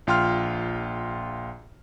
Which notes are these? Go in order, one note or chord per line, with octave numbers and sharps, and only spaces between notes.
A#1 F4 G5 C6 F6